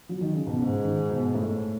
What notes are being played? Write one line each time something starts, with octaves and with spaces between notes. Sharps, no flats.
F#3
D#3
C#3
B2
G#2 C#3
D#3
B2
A2